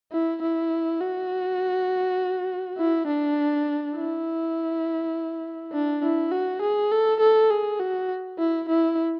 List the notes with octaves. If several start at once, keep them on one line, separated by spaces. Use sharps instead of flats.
E4
E4
F#4
E4
D4
E4
D4
E4
F#4
G#4
A4
A4
G#4
F#4
E4
E4